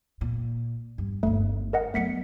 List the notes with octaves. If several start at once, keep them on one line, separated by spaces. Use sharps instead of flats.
A#2
G2
G1 D#2 A3
A#4 D#5 F#5
F#3 A3 B3 B6 C#7